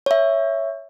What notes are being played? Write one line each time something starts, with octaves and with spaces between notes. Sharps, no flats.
C#5 E5